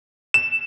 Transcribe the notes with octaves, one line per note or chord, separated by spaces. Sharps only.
E7